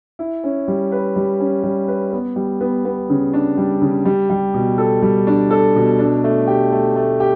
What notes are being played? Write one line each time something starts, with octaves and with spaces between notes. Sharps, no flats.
E4
C#4
G3
B4
G3
C#4
G3
B4
B3
G3
B3
B3
C#3
D4
G3
C#3
G3
G3
B2
A4
G3
D4
A4
B2
D4
A3
G4
A3
A3
G4